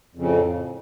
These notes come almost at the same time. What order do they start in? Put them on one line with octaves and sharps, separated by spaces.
F2 C#3 A2